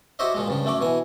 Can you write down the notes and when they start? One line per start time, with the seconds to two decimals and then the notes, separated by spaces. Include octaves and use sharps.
0.19 F#4 G4 C5 C#5 D#5 E5
0.34 A#2 F3 G#3
0.48 G2 C#3 F3
0.65 F#2 A3 C#4 D6
0.81 B2 E3 G#5